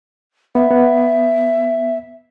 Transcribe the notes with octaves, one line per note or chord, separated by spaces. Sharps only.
B3 E5
B3